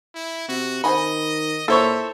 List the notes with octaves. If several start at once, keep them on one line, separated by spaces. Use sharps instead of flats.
E4
C3 F#4
D#3 C5 D#5 G#5 B5
A#2 E4 A4 C5 C#5 E5